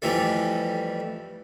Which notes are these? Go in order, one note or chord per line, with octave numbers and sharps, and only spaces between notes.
F2 E3 G3 A3